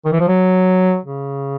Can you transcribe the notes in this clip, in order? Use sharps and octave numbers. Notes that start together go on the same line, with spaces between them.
D#3
E3
F3
F#3
C#3